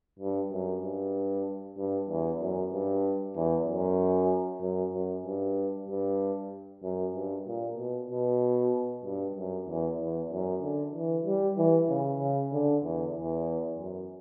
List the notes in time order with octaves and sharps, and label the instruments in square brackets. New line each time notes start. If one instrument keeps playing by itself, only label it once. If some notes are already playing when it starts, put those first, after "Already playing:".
[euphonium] G2
F#2
G2
G2
E2
F#2
G2
E2
F#2
F#2
F#2
G2
G2
F#2
G2
A#2
B2
B2
G2
F#2
E2
E2
F#2
D3
E3
G3
E3
C#3
C#3
D3
E2
E2
F#2